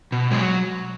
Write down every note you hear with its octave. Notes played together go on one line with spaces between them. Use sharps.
B2
F#3 G#3